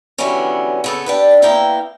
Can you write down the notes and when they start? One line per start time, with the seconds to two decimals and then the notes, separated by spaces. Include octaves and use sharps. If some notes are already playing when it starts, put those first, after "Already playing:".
0.18 D3 E3 F#3 G3 B3 C#4
0.84 C#3 B3 A4
1.06 D4 G4 B4
1.42 A#3 B3 E4 A#4 F5 G5